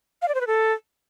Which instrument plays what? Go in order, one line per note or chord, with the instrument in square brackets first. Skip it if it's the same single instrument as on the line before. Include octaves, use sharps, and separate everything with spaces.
[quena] F5
D5
C5
B4
A4